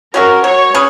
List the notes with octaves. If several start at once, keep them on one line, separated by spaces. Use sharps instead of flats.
F#3 C#4 F#4 A#4
F#3 C#5
C#4 G#4 B4